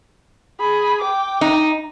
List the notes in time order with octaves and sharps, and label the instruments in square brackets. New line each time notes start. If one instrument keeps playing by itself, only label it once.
[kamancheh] G#4 B5
G5 D6
[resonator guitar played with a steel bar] D#4